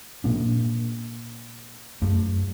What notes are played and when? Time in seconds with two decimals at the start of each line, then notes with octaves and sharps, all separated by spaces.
0.24 A#2 A#3 D4
2.02 F#2 A3